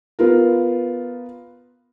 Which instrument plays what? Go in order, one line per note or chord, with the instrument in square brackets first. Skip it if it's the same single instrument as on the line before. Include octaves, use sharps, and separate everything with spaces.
[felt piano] B3 F4 A#4